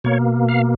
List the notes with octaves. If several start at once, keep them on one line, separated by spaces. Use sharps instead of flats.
B2 A#3 C#5
F5